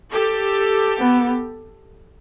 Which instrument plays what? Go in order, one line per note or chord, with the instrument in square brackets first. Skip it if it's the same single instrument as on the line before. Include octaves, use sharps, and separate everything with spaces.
[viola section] G4 A4
[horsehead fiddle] B3